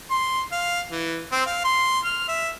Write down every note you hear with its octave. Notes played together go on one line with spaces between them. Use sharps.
C6
F5
E3
C4
F5
C6
F6
E5